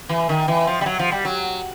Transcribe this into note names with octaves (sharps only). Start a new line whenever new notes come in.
E3
D#3
E3
F3
G3
F#3
F3
G3
F#3